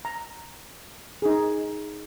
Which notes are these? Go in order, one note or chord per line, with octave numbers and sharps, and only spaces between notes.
A#5
D#4 G#4